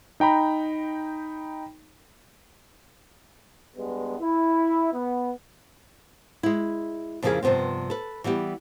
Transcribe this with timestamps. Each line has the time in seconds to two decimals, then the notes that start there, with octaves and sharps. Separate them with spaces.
0.20 D#4 G5 A#5 B5
3.76 G2 G#3 B3
4.20 E4
4.93 B3
6.43 G#3 E4
7.22 F2 C#3 F3 A#3 E4 G#4
7.42 G2 C3 F3 B3 C4
7.90 A4 B4
8.24 E3 G3 B3 G4